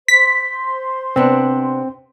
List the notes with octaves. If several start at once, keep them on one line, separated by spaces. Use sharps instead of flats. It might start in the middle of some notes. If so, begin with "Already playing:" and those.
C5 C6 B6
C3 B3 C4 D4